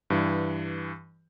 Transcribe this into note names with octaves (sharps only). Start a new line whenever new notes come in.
G2 E3